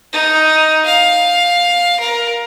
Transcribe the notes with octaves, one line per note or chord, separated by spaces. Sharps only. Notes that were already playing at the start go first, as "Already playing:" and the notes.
D#4
F5
A#4